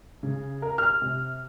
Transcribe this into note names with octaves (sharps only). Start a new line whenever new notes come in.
C#3
A#4
F6
C3